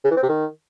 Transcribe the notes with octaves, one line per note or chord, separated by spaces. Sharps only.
C#3
E3
C4
C3
D#3